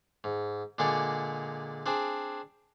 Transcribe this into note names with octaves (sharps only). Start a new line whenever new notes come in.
G#2
A#2 D3 G#3 G#4 D5 C#6
C4 D4 G#4